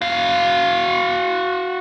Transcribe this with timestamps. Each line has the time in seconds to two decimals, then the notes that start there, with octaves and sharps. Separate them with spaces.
0.02 F#4 F5